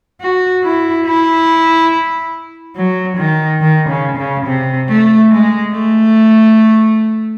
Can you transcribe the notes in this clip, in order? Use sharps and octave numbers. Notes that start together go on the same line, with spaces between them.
F#4
E4
E4
F#3
D#3
D#3
C#3
C#3
C3
A3
G#3
A3